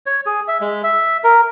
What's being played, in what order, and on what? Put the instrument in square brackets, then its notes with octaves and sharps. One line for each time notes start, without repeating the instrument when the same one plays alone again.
[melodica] C#5
G#4
E5
G#3
E5
A#4